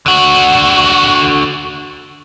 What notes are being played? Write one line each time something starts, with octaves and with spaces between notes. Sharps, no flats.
D3 F#4